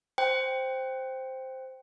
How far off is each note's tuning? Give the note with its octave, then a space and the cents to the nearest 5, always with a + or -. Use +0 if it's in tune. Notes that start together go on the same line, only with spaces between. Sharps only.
C5 +0 G5 +0